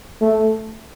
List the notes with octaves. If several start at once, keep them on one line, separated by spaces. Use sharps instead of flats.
A3